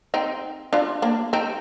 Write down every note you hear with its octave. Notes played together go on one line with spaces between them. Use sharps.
C4 D#4
D4 F4
A#3 D4
C4 D#4